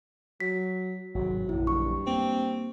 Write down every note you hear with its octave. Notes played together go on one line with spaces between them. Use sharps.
F#3 B6
G#1 C3 F#3
A#1 F#2 D3 E4
G2 C#6
A#3 C4